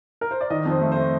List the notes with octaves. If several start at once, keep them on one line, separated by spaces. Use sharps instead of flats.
A#4
C5
D5
D#3 D#5
F2
C5
A3
C5
A3